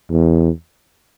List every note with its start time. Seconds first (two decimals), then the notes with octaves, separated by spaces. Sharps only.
0.11 E2